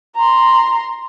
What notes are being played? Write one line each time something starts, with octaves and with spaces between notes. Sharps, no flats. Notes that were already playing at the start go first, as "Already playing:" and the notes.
A#5 C6